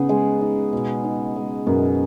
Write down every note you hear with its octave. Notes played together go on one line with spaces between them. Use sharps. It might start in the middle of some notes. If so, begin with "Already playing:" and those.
Already playing: C#3 B3 D#4 G#4
G#3
D#4
B2
D#4
G#3
F#2 B2